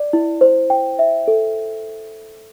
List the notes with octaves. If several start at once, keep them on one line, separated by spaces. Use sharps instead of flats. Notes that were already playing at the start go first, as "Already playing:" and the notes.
Already playing: D5
E4
C5
G5
E5
A4